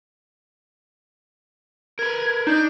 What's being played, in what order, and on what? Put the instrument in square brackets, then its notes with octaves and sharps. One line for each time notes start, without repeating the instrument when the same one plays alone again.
[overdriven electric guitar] A#4 B4 [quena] G#6
[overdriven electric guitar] D4 [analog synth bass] D#4 [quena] G6